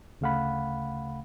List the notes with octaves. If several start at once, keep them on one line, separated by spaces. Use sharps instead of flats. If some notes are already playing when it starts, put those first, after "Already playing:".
D2 C#3 A3 F5 F#5 B5